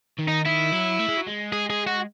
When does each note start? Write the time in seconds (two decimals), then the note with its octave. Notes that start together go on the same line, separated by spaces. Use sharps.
0.19 D#3
0.28 D#4
0.45 D#3 E4
0.72 F#3
0.99 A3
1.08 G#3
1.17 F#3
1.27 G#3
1.52 G#4
1.70 G#4
1.87 F#4